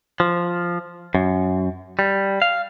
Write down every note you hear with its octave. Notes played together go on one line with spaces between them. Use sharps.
F3
F#2
G3
F5